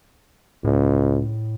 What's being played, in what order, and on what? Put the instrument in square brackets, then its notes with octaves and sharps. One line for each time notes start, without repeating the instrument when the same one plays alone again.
[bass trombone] C#2 [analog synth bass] A2